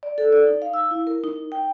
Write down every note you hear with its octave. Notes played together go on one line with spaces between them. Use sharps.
D5
A4
D5
D#4
F5
E6
E4
A#4
D#4
G5